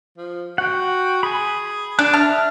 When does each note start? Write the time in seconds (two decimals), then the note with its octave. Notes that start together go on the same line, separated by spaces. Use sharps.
0.17 F3
0.58 F#4 F#5 G5
1.23 G#4 G#5 B5
1.99 D4 F#6
2.13 E5 A5 F6